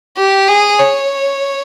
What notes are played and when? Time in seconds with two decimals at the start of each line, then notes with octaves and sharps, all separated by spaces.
0.18 G4
0.48 G#4
0.79 C#5